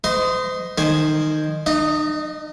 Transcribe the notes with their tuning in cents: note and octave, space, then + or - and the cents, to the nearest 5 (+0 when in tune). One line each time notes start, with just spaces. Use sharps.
C5 -40 D#5 +0 C6 +20
D#3 -15 C5 +0 G#5 +0
D#4 -40 D#5 +0